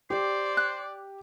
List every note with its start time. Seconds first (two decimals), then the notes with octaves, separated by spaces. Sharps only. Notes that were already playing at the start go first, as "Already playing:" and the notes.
0.10 G4 C5 D5
0.57 F#6